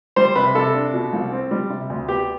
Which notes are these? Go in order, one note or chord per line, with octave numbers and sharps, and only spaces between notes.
G3 C5
C3 B4
C3 A4
D4
B2
C2
C4
G3
C3
D2
B3 G4